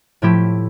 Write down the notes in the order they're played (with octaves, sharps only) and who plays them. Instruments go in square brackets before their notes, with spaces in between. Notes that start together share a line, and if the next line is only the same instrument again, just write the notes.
[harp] A2 F3 A3 E4 G4